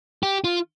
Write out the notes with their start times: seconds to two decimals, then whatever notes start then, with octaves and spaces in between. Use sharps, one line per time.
0.23 G4
0.44 F4